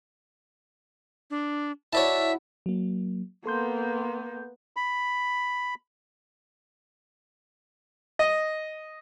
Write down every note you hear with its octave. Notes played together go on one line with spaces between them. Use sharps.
D4
E4 F#4 C#5 D5 E5 A5
F#3 A#3
A#3 B3 A4 C6 G6
B5
D#5